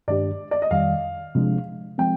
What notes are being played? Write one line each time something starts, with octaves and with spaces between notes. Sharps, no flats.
G2 D#3 G#3 D4 G4 D5
D5
D#5
F2 D#3 G3 F5
C3 F3 G#3 D4
F3 G#3 C4 G5